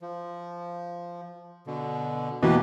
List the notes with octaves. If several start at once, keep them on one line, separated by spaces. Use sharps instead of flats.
F3
B2 D3
B2 E3 A#3 G4 B4 D#5